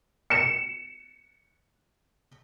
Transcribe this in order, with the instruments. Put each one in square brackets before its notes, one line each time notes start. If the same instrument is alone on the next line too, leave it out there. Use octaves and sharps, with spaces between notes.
[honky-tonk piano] C#7 E7